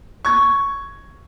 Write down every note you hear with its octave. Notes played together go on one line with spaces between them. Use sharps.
C#6 G#6